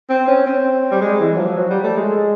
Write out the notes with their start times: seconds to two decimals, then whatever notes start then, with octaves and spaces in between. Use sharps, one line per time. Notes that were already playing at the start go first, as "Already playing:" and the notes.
0.10 C4
0.28 C#4
0.46 C4
0.92 G3
1.02 G#3
1.20 E3
1.35 F#3
1.38 F3
1.57 F#3
1.71 G3
1.84 A3
1.97 G#3